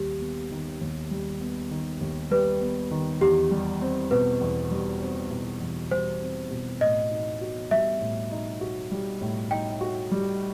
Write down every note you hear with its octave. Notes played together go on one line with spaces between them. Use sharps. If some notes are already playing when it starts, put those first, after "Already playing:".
Already playing: D#2 G3 G4
B3
D#3
D#2
G3
B3
D#3
D#2
G3 B4
B3
D#3
E2 G4
G3
C4
B2 B4
E2
G3
C4
B2
E2
G3 C5
C4
B2
A2 D#5
D#4
F#4
G3 E5
A2
D#4
F#4
G3
A2
D#4 G5
F#4
G3